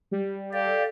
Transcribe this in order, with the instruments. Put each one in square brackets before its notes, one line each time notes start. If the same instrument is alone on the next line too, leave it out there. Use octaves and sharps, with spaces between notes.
[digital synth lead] G3
[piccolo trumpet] G4 [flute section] A4 F5 [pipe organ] D5